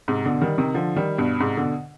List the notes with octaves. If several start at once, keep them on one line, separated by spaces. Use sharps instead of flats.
G#2 C3
B2 D3
D#3 G3
C3 D#3
D3 F3
D#3 G3
G2 B2
G#2 C3
B2 D3